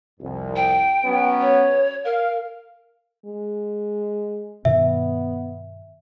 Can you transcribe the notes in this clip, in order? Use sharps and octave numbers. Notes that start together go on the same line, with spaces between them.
C2 F2
G5
F#3 B3 C#4
C#5
A#4 F5
G#3
G2 B2 D#3 B3 E5